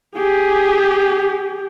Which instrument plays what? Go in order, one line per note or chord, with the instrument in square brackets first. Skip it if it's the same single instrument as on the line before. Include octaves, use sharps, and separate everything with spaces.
[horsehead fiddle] G4 G#4